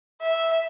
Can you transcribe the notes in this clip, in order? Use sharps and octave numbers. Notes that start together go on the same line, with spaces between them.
E5